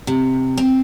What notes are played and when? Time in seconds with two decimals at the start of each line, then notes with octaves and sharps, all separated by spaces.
0.07 C3
0.57 C4